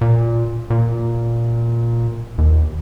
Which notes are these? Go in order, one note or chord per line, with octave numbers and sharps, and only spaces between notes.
A#2
A#2
D#2